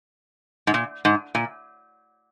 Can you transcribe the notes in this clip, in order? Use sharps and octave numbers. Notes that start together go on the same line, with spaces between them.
G#2
A#2
G#2
A#2